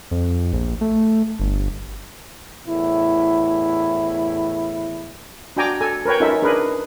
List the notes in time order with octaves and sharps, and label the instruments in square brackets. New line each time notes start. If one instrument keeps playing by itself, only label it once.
[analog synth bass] F2
A#1
A3
G1
[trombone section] E2 A2 E4
[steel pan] D4 F#4 G5 G#5 A#5 D6
A4 G#5
A#4 B4 C#5 G5
C#4 D#4 F4 A4 A#4 E5
D4 G#4 A#4 B4